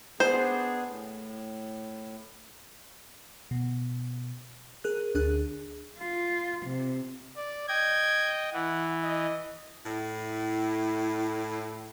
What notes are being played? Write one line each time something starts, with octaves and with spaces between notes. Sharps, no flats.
B3 D4 G#4 C5
A2
B2
G#4 A#4 F#6
D2 D4 G#4 F#6
F4
C3
D5
D#5 G5 G#6
E3 F#5
D#5
A2 E4